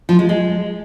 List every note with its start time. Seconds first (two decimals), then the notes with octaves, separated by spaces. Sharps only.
0.09 F3
0.19 G#3
0.29 G#3